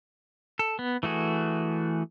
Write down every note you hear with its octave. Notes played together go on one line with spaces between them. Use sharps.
A4
B3
E3 A3 F#4 G#4